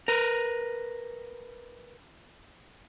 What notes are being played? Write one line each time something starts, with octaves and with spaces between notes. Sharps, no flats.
A#4 B4